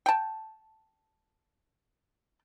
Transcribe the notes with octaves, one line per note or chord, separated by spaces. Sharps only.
G5 A5